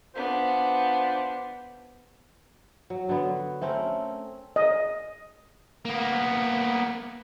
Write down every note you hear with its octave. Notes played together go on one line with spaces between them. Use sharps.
B3 D4 F4 C5
F#3
D3 F#3 B3
A3 C4 C#4 A#4
D#5
A#3 B3